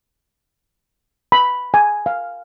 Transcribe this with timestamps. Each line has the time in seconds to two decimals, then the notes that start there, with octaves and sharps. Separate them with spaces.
1.32 B5
1.74 G#5
2.06 F5